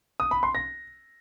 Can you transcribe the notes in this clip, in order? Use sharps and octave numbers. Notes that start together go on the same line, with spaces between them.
D#6
B5
C6
A#6